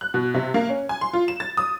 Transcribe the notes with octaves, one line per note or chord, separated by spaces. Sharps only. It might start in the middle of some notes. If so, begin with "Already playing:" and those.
F#6
B2
C3
A#3
C#4
G#5
C6
F4
E7
A6
D#6